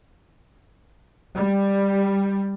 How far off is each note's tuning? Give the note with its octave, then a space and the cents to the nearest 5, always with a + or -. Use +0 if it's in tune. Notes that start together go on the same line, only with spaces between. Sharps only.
G3 +10